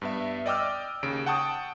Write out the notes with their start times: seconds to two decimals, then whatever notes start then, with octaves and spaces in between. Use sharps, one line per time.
0.02 G2 B3 E5
0.46 D5 D#5 G5 D6 E6 F6
1.03 D#2 C#3 D7
1.26 F#5 G5 A5 C#6 D#6